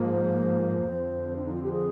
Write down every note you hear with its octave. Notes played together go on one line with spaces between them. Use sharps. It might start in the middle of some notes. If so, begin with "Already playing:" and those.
Already playing: G#2 F3 A#3
C5
F2 D3 F3 C4
D4
D#4
F4
G4
G#4